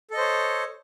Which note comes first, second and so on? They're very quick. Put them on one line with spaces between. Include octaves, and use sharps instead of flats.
A4 D#5 C5 C#5